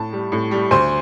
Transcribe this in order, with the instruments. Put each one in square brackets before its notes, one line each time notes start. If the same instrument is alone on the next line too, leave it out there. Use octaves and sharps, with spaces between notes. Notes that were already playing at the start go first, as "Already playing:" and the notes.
Already playing: [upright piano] A2 A5
G3
A2
G3
D2 C5 C6